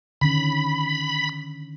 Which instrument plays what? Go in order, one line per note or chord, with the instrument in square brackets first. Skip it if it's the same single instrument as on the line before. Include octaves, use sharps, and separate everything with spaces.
[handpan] D3 D#3 C#4 [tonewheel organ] B5